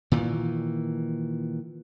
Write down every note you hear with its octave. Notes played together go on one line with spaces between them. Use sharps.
A#2 D#3 E3